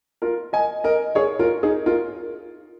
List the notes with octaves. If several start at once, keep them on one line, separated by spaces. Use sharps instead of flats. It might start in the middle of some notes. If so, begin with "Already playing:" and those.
F4 A#4
D#5 G#5
A#4 D#5
G#4 C#5
F4 A#4
D#4 G#4
F4 A#4